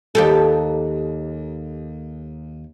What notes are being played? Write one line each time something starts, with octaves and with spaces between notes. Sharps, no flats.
D#2 G4 A4